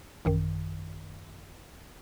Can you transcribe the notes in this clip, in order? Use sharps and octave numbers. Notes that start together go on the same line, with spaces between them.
A1 F#2 D#3